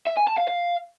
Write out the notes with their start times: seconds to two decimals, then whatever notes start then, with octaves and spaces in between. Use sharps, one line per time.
0.07 E5
0.17 G#5
0.28 A5
0.38 F5
0.48 F5